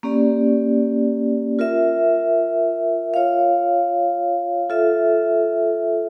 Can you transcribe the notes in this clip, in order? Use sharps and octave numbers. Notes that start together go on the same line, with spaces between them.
A#3 C#4 G4 D5
F4 A#4 E5
F4 C#5 F5
F4 A4 E5